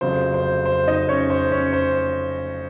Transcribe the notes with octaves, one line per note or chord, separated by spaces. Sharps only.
F1 F2 C#3 F#3 C5
C5
C5
D#4 D#5
C#4 C#5
C5
C#4 C#5
C5